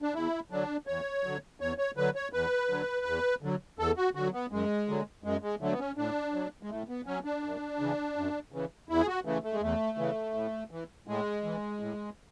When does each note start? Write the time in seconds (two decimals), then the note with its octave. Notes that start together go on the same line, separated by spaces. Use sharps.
0.02 D4
0.14 E2 E4
0.51 D3 F#3 D4
0.87 E2 C#5
1.24 D3 F#3
1.60 E2 C#5
1.78 C#5
1.97 D3 F#3 B4
2.15 C#5
2.33 E2 B4
2.70 D3 F#3
3.06 E2
3.42 D3 F#3
3.79 E2 A4
3.97 F#4
4.15 D3 F#3 F#4
4.33 B3
4.52 F#2 G#3
4.89 D3 F#3
5.24 F#2 G#3
5.43 G#3
5.61 D3 F#3 A3
5.72 B3
5.79 C#4
5.97 A2 D4
6.34 F#3
6.63 G#3
6.70 A2 A3
6.89 B3
7.06 F#3 C#4
7.25 D4
7.43 F#2
7.79 C#3 E3
8.16 F#2
8.52 C#3 E3
8.89 E2 E4
9.00 G#4
9.07 F#4
9.25 C#3 E3 A3
9.44 A3
9.53 G#3
9.62 E2 A3
9.98 C#3 E3
10.34 A2
10.71 E3
11.07 A2 G#3
11.44 E3
11.80 A2